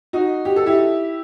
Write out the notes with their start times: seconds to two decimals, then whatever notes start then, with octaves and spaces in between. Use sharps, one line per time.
0.13 D#4 F#4
0.45 G4
0.56 A4
0.66 E4 G4